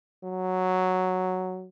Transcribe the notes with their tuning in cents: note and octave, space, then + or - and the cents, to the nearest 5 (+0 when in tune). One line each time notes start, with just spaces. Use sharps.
F#3 +0